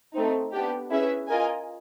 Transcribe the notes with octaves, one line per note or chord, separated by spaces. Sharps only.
A3 C4 D#4
B3 D4 G4
C#4 E4 G#4 B4 E5
F4 A#4 D#5 G#5